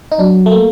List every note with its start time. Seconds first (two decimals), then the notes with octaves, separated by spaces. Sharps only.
0.12 D#4
0.19 F#3 D4
0.46 A3
0.51 A#3